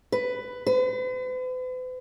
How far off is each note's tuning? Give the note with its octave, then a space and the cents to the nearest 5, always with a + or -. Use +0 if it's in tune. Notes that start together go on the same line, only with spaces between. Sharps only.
B4 +10
B4 +45